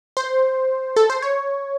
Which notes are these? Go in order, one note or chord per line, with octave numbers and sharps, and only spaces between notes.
C5
A4
C5
C#5